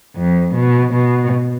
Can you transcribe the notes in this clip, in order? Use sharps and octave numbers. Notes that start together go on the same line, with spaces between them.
F2
B2
B2